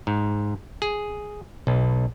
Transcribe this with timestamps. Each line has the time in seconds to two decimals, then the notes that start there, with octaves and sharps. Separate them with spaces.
0.07 G#2
0.82 G#4
1.67 B1